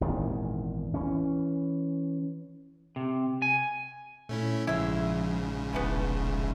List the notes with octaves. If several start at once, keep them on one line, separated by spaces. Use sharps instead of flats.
G#1 E2 A#2 D#3
E3 C#4
C3
G#5
A#2 A3 C#4 E4
A#1 G#2 C#3 F3 E4 E5
E1 E3 A3 B3